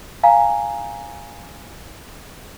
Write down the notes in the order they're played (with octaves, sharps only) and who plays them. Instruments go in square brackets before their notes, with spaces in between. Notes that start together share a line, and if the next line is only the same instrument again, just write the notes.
[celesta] F5 G#5 A#5